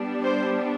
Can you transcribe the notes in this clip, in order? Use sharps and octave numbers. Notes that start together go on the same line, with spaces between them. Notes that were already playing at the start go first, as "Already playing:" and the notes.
Already playing: G3 B3 D4
C5